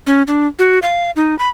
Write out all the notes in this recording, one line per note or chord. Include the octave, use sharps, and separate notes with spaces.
C#4
D4
F#4
F5
D#4
B5